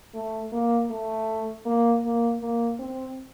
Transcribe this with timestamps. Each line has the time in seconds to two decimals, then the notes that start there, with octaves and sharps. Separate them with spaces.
0.14 A3
0.52 A#3
0.90 A3
1.66 A#3
2.03 A#3
2.41 A#3
2.79 C4